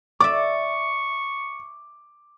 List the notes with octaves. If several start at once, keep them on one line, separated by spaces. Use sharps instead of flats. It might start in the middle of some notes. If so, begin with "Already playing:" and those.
D5 E5 C#6 D6